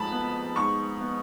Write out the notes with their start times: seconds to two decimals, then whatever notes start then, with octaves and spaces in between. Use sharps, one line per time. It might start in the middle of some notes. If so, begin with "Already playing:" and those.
Already playing: F2 G#2 A3 A5 B5
0.12 B3
0.56 G#2 C#6
1.01 B3